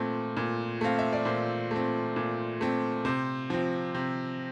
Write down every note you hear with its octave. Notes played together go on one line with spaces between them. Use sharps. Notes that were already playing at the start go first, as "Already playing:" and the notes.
Already playing: A#2 A3 C4
A#2
A3 C4 F5
E5
D5
A#2 C5
A3 C4
A#2
A3 C4
C3 C5
F3 C4
C3